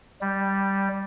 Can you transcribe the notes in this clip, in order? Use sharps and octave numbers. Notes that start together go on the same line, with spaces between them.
G3